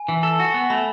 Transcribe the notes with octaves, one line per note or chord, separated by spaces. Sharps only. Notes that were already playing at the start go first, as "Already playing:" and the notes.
Already playing: G#5
E3
A4
F#4
B3
A3 B5